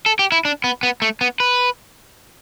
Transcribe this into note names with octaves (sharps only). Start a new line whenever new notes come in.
A4
G4
E4
D4
B3
B3
A3
B3
B4